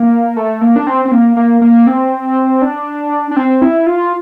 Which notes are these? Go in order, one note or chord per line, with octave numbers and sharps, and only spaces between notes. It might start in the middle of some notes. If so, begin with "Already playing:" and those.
Already playing: A#3
A3
A#3
D4
C4
C4
A#3
A#3
A#3
C4
D4
D4
C4
E4
F4